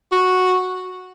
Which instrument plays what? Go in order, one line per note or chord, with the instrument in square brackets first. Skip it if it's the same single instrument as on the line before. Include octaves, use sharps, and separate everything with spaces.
[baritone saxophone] F#4